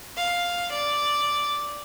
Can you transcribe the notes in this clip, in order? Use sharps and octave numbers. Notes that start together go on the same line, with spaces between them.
F5
D5